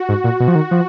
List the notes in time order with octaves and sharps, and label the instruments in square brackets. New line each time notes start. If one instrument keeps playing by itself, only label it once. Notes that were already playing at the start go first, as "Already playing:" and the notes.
Already playing: [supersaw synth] F#4
[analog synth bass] G#2
A#2
B2
F3
D#3
F3